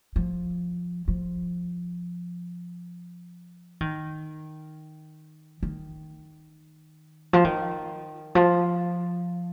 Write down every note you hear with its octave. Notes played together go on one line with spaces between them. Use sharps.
F3
F3
D#3
D#3
F3
D#3
F3